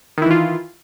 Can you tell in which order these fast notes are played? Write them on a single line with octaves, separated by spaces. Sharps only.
D#3 E4 E3 F4